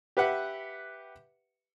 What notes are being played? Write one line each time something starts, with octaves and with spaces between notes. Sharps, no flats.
G4 B4 E5 F#5 F#6